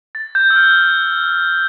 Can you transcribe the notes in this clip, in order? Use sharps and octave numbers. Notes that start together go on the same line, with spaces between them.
A6
G6
E6
F6